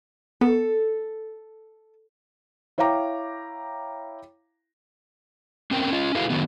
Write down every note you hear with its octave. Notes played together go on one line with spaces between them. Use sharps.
B3 A4
E4 C#5 F5 G5 A#5 D6
C4 C#4 A#4 G5
C#4 F4
E4 F#4 G#4 A4 B4 F5
D3 D#3 F#3 B3